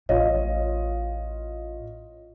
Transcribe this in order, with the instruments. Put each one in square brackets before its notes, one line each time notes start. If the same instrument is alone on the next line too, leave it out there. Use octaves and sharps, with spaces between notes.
[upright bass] A1 [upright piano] F4 C#5 D#5